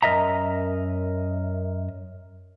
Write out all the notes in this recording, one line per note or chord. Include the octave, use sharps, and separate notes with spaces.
F#2 A#4 D#5 E5 A#5